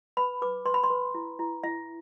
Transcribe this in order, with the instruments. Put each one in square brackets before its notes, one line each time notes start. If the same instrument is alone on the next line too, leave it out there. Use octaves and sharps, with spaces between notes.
[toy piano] B4 B5
B4 D6
B4 C6
B5
C6
B4
E4
E4
E4 E5